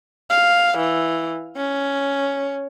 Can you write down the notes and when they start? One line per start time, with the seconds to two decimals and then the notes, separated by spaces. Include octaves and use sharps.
0.30 F5
0.78 E3
1.56 C#4